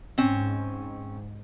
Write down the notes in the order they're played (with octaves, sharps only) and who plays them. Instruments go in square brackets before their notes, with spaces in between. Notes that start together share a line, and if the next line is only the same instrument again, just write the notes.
[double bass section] G#2 [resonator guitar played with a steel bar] C4 C#4